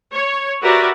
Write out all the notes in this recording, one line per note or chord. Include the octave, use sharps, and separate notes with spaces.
C#5
F#4 G4 A#4 B4 D5 E5